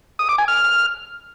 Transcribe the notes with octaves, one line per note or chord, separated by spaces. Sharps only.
D#6
D6
G#5
F6